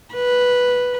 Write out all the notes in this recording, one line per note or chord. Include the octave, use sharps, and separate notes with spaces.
B4